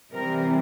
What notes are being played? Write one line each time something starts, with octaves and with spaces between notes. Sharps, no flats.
C3 E3 G3 C4 A#4